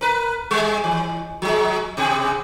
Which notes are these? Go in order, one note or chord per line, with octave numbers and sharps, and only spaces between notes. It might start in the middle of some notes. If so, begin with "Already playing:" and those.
A#4 B4
G3 G#3
E3
F3 G#3
B2 G4 G#4